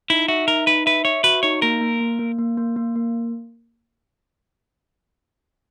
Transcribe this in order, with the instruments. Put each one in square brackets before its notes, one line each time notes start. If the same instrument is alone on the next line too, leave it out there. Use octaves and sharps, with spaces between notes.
[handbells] D#4 [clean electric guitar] E4
[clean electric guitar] F#4 [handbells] E5
[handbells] D#4 [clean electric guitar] A#4
[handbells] D#4 [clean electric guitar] B4
[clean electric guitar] B4 [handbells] E5
[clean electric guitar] C#5 [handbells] E5
[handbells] F#4 [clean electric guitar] B4
[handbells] D#4 [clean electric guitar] C#5
[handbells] A#3 [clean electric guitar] A#4
[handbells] A#3
A#3
A#3
A#3
A#3
A#3
A#3